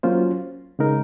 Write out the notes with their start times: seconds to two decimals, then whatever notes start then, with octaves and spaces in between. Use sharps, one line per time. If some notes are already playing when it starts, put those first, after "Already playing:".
0.03 F#3 A#3 C#4 F4 C5
0.79 C#3 G#3 D#4 A#4